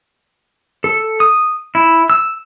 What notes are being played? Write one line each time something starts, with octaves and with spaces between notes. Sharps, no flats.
A4
D#6
E4
E6